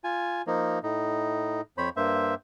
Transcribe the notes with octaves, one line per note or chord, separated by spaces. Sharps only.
F4 G#5
F3 A#3 D#4
A2 D#4
F2 C5 C#5 B5
G2 A#3 C5 E5